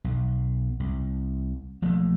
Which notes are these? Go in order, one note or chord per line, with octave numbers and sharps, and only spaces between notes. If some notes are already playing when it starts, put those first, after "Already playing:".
B1
C2
B1 F3 A3 A#3